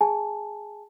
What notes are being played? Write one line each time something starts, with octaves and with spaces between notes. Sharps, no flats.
G#4 G#5 A5